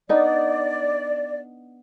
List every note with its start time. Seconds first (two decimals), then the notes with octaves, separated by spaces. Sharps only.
0.09 B3 D4 D#4 D5